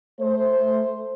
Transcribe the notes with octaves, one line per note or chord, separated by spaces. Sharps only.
A3 C5